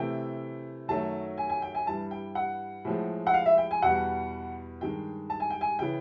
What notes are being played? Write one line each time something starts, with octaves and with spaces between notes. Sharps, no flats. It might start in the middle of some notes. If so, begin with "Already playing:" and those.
Already playing: C3 E3 A3 G5
F#2 D#3 F#3 A3 A5
G#5
G#5
G5
G#5
G2 E3 G3 A5
G5
F#5
A2 F3 G#3
F#5
F5
E5
G5
G#5
E2 B2 G3 F#5
G2 D#3 G#3 G5
A5
G#5
G5
G#5
C#3 E3 G5